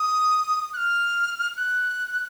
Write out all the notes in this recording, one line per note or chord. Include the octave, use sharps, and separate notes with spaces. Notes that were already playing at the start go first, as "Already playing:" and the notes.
Already playing: D#6
F#6
F6
F#6